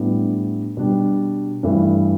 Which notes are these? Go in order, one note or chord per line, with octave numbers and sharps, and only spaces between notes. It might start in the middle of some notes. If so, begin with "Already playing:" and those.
Already playing: A2 G3 B3 D4
B2 G3 D4
G2 E3 A3 E4